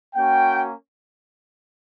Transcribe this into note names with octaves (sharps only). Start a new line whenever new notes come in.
A#3 C#4 F#4 G5